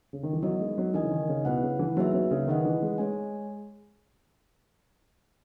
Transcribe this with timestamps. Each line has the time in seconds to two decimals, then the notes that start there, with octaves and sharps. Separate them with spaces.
0.13 C#3
0.23 D#3
0.33 E3
0.42 F#3 B3 D#4 F#4 A#4 D#5
0.60 G#3
0.78 F#3
0.94 E3 D#4 A#4 D#5 G#5
1.03 C#3
1.11 D#3
1.29 C#3
1.45 B2 E4 B4 F#5
1.63 C#3
1.79 E3
1.97 F#3 A#3 D#4 G#4 B4 E5
2.14 F#3
2.31 C#3
2.47 D#3 D#4 G#4 B4 D#5 F#5
2.65 E3
2.82 G#3
2.98 G#3 G#4 C#5 G#5